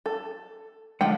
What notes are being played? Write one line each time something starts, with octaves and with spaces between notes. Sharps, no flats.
A4
D3 F3 G#3 F#5 G5